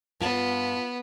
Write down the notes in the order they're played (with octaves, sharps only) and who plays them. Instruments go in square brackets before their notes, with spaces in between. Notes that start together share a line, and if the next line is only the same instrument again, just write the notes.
[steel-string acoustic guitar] G2 F4 A5 [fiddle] B3